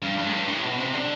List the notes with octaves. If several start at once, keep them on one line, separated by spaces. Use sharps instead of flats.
G2
G2
A2
G2
A2
B2
C3
D3